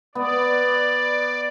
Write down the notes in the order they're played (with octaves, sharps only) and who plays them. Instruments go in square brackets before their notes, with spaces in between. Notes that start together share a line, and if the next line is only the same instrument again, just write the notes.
[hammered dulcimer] B3 [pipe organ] D5